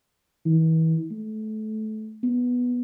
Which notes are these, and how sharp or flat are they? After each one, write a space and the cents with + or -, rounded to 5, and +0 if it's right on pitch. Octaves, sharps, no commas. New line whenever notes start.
E3 -40
A3 -25
B3 -5